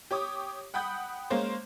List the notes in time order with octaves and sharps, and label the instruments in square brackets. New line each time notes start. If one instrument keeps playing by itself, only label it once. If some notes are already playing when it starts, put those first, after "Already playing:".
[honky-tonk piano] G4 C#5 D6 D#6
F#5 G5 B5 D#6 G6
G#3 A#3 C#4 C5